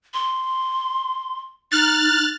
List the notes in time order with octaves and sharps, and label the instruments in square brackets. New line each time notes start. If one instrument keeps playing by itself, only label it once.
[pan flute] C6
[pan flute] D#4 [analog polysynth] F6 F#6 A6